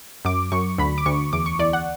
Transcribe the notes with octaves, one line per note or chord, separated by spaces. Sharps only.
F#2 D6
F#2 C#6
D2 B5
D6
D2 C#6
E2 D6
C#6
E2 D5
F#5